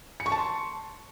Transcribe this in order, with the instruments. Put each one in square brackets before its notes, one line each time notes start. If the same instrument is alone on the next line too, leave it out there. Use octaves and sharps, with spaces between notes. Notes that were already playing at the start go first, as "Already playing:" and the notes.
[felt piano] C#7
C#6
A5
C6